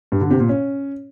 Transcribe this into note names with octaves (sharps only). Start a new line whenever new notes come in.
G2
D3
C3
A#2
C#4